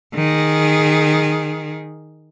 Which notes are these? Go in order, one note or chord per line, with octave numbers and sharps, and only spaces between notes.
D#3 G#4